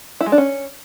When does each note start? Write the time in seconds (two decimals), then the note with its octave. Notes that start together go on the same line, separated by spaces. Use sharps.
0.21 E4
0.26 G#3
0.32 D4
0.38 C#4